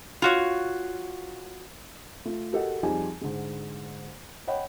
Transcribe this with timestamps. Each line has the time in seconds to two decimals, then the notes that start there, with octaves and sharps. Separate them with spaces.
0.22 F4 F#4 C#5
2.25 A3 F4
2.53 F#4 G4 A4 A#4 D#5 F#5
2.83 F2 G3 D#4 G4 G#4 G#5
3.21 G#2 D3 G#3
4.47 C#5 D#5 F#5 G5 B5